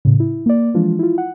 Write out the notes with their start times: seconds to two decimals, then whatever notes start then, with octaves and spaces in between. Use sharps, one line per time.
0.05 A2 C#3
0.20 E4
0.46 A#3 D5
0.74 E3 F3 G#3 D4 F4
0.99 E4 F4
1.18 F#5